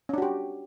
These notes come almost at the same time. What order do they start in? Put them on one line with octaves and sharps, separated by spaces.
C#4 D4 F#4 G4